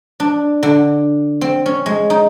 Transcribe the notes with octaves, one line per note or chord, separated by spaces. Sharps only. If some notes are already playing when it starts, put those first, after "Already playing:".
D4
D3
C4
C#4
G#3
D#4